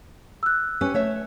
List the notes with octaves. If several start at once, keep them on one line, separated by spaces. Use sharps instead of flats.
E6 F#6
C#4 G4 B4
A3 C#5 E5